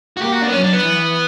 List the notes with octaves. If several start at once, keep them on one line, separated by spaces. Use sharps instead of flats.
F#4
A#3 G4
F#4
D4
B3
F#3 C#4
D4
B3
E3